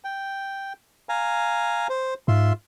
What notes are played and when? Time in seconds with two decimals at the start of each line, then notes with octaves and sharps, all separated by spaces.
0.04 G5
1.09 F5 G#5 A#5
1.89 C5
2.28 G#2 F4 E5 C6